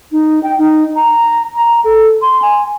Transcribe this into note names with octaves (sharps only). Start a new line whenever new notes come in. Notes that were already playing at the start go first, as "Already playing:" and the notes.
D#4
G5
D#4
A#5
A#5
A4
C6
G#5